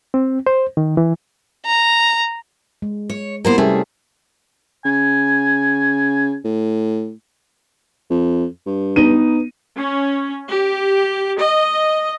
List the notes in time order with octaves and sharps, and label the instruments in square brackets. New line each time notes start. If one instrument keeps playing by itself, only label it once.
[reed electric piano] C4
C5
D#3
E3
[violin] A#5
[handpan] G#3
[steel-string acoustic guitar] C#5
[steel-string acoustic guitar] A#3 B3 C5 [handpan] E4 G4
[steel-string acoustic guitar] C3 A3 G#4 [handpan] G3 C#4 A#4
[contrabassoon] C#3 [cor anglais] G#5
[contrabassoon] A2
F2
G2
[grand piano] B3 D#4 D#7
[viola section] C#4
G4
D#5